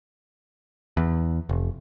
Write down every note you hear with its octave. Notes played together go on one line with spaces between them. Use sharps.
E2
F1